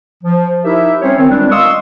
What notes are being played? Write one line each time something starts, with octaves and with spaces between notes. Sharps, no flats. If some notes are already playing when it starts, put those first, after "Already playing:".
F3
D#4 E4 G4 A#4 E5
G3 C4 C#4 C5 C#5
D#3 C4
C#2 G3 G#3 D4
D#5 F5 C6 C#6 D#6 E6